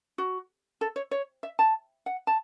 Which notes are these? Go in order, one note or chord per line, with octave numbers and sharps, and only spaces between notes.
F#4
A4
C#5
C#5
E5
A5
F#5
A5